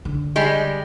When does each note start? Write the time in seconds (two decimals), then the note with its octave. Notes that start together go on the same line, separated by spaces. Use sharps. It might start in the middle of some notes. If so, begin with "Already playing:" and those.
0.05 D3
0.36 G3 G#3